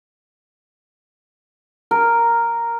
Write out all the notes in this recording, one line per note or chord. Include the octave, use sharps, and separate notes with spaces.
A#4